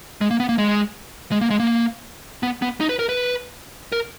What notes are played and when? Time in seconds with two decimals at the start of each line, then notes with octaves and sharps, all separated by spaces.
0.21 G#3
0.31 A#3
0.40 B3
0.49 A#3
0.58 G#3
1.31 G#3
1.41 A#3
1.50 G#3
1.60 A#3
2.43 B3
2.62 B3
2.81 D#4
2.89 B4
2.99 A#4
3.09 B4
3.92 A#4